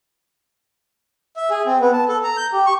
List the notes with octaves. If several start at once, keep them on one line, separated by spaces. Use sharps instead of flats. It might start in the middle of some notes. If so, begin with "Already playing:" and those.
E5
G#4
C4
B3
A5
A4
A#5
G6
G4
C#6